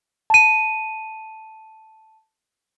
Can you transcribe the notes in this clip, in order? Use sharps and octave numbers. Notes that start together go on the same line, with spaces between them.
A5 D#7